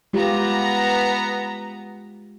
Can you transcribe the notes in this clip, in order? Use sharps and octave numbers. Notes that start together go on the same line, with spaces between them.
G#3 B3 F4 G4 A#5